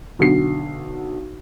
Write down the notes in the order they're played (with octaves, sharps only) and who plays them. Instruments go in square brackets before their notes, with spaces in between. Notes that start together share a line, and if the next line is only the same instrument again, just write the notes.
[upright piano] B1 D3 F#4 C7